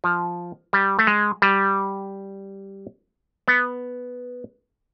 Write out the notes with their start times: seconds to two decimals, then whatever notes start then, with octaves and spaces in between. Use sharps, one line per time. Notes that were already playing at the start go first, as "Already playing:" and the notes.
0.04 F3
0.73 G3
0.99 A3
1.07 G#3
1.42 G3
3.48 B3